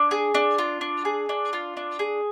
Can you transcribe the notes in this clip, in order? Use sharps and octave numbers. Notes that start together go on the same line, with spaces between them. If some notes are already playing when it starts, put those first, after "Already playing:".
Already playing: D4
G#4
D4
F4
D4
G#4
D4
F4
D4
G#4